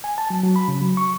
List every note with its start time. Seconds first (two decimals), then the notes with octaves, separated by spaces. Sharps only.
0.04 G#5
0.18 A5
0.30 F#3
0.43 F#3
0.56 B5
0.68 C#3
0.82 F#3
0.97 C#6